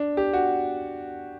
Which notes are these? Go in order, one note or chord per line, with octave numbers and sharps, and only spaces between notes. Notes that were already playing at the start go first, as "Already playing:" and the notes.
Already playing: D4
G4
F#4